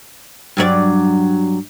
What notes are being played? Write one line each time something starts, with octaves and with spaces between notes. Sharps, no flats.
G2 F#3 D5